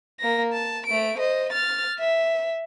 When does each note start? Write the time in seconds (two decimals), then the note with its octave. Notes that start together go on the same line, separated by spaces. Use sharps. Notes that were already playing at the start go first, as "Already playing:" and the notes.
0.20 A#3 A#6
0.53 A5
0.87 A3 D7
1.18 C5 D#5
1.53 F6 A6
1.99 E5